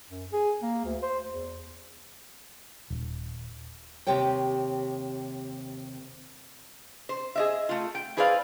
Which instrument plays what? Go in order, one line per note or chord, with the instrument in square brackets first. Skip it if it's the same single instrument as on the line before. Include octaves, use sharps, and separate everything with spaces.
[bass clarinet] F#2
G#4
A#3
D2
C5
E2
[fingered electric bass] D#1
[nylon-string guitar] D#2 C3 G4 C#5 G5
[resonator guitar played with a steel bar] C5
G#4 D#5 E5
A3 F4
G5
E4 G#4 B4 C5 D5 F5